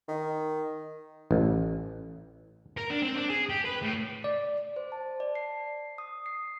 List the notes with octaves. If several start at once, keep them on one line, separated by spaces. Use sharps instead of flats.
D#3
A1
A#4
D4
C4
D4
G#4
G4
B4
A2
D5
C5
A5
D5
C7
D#6
C7